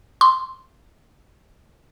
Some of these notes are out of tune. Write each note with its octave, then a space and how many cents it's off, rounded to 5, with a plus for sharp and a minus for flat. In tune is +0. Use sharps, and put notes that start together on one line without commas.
C6 -5